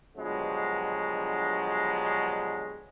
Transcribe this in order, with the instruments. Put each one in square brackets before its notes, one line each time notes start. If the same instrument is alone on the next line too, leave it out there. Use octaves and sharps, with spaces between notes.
[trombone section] G2 B2 D3 F3 F#3 G#3